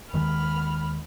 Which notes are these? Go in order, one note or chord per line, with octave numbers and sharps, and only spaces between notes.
D#2 D#3 G#3 B5 F6